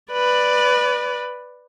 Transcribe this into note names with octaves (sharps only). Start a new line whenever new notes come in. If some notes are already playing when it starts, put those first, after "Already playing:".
B4 D5